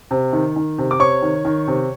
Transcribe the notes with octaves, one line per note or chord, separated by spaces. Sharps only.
C3
D#3
D#3
C3
D6
C3 C#5 C#6
D#3
D#3
C3